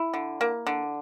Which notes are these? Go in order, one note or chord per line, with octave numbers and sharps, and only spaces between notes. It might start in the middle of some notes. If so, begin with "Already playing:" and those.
Already playing: E4
D3
A#3
D3